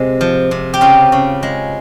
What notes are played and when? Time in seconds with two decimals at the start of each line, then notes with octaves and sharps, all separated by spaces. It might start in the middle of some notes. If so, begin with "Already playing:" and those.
Already playing: C3 G#3
0.21 F3
0.51 C3
0.74 G4
0.81 C#3 F4
1.12 C#3
1.43 G#3